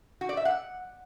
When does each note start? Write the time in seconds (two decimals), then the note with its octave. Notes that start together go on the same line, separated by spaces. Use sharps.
0.21 F#4
0.29 D5
0.37 E5
0.45 F#5